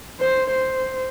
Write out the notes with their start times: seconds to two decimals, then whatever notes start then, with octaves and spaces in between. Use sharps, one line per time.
0.20 C5
0.51 C5